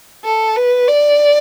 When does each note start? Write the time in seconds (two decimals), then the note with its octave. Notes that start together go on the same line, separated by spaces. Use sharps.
0.25 A4
0.56 B4
0.87 D5